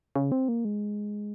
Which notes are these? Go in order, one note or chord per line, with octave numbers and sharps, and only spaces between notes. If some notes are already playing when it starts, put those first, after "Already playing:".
C#3
C4
A#3
G#3